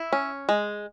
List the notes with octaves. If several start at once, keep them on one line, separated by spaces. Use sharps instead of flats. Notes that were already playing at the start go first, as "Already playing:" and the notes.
Already playing: E4
C#4
G#3